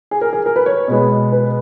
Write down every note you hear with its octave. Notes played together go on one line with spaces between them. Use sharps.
G#4
A#4
G#4
A#4
B4
C#5
B2 G#3 B3
B4